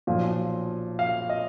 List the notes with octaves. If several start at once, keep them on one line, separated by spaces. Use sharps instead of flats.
B1 A#2 F3
F5
D#5